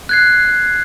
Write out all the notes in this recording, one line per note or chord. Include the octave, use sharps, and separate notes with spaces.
F#6 G#6 C7